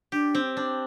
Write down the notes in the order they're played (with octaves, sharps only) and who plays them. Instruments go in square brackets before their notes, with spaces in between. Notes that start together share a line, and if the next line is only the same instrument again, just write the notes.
[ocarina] D4 [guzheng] G4
[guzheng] C4
D4